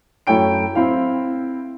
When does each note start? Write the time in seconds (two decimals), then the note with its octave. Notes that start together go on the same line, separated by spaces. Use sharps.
0.27 F#2 A3 E4 C#5 G5 D7
0.75 C4 E4 F5